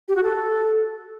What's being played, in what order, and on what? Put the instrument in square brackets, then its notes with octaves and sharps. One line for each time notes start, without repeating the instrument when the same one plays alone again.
[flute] G4
F#4
A4